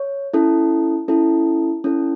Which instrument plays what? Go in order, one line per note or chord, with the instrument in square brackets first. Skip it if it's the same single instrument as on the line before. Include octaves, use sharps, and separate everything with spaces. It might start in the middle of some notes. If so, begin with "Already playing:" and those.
Already playing: [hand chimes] C#5
C#4 E4 A4
C#4 E4 A4
C#4 E4 A4